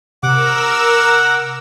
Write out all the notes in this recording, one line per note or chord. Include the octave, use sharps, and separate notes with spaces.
C3 A#4 F#5 D6 E6